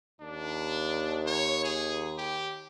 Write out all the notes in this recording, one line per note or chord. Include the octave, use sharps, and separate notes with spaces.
D#2 D4
C#5
G#4
G4